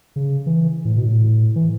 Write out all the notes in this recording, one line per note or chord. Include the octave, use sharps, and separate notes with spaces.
C#3
E3
A2
B2
A2
E3